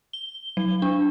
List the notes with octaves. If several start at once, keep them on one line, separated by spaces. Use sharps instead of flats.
G7
F#3
D4